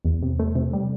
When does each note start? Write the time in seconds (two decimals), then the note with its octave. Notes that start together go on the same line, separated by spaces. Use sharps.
0.05 E2
0.23 C3
0.39 A3
0.55 C3
0.73 G3